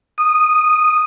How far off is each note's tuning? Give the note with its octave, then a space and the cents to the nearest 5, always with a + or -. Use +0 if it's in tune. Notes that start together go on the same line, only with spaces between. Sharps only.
D#6 -10